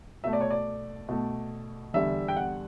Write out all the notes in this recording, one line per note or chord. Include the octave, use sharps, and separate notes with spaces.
B2 A3 E5
D5
C#5
D5
B2 A3
E2 D3 G3 E5
G5
F#5